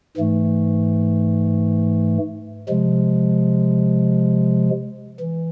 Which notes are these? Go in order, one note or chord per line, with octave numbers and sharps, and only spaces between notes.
G#2 E3 A3
C3 F3 G#3
E3